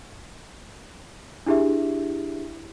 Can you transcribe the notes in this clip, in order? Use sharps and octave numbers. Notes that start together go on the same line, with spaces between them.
D4 E4 G4 G#4 E5